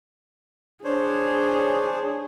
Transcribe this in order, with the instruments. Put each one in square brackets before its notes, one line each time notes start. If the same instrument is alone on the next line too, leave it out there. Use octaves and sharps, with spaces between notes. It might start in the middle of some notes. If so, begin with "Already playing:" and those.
[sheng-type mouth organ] D4 C5 C#5 [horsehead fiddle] G#4